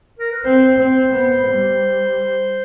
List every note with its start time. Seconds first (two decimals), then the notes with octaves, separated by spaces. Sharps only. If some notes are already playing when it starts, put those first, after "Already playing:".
0.19 A#4
0.32 B4
0.44 C4 C5
0.79 C4
1.13 B3
1.48 G3